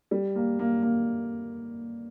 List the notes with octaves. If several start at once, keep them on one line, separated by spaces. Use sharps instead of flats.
G3
A#3
A#3
A#3